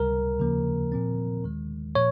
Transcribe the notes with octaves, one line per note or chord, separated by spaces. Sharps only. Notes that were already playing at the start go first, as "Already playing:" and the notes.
Already playing: C#2 C3 G3 A#4
D#2 C#3 F3 A#3
A#2 F3 C4
D#2 D#3 G#3
A#2 F3 C#5